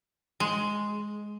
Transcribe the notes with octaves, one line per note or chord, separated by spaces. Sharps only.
G#3